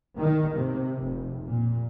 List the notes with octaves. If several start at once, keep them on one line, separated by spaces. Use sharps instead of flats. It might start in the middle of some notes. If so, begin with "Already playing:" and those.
D#3
C3
F1
A#2